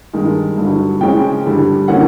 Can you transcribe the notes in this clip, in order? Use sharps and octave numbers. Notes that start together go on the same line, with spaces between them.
G2 D#3 G#3
G2 D3 F#3
C#3 F3 G#3 C#4 G5
G2 D3 G3
D3 F#3 A#3 C#4 F#5